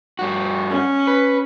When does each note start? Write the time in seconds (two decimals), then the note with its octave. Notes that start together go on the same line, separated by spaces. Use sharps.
0.19 G2 F#4
0.70 C#4
1.07 B4